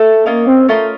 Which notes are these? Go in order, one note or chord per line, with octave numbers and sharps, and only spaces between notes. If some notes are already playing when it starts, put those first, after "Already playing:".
Already playing: A3 A4
A#3 C#4 F4 A#4 D#5
C4
A3 C#4 F4 A#4 D#5